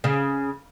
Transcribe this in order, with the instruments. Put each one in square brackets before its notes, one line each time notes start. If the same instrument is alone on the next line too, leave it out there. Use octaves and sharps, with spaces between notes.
[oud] C#3